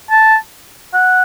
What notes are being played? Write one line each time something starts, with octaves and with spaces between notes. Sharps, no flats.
A5
F#5